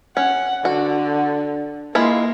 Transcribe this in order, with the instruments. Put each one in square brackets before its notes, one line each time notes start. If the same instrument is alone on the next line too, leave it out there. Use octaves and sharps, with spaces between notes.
[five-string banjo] C#4 [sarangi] F#5
[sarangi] D3 [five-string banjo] F#4
[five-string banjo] G#3 E4 F4 [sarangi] A#3